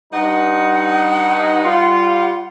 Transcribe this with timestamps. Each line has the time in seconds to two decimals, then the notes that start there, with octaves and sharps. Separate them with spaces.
0.13 G2 D#4 F#5
1.64 G3 F4